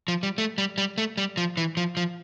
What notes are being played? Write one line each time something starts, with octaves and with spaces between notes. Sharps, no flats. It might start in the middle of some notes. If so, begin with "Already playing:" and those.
F3
G3
A3
G3
G3
A3
G3
F3
E3
F3
F3